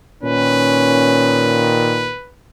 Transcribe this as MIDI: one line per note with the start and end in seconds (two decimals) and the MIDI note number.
0.23 2.17 46
0.23 2.17 51
0.23 1.74 61
0.23 2.33 71